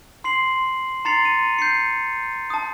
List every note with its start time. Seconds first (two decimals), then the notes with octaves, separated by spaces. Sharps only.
0.24 C6 C7 F#7
1.05 A#5 C6 A6 C7 C#7 F7
1.25 D#7
1.59 G6 C7 C#7
2.50 A5 D#6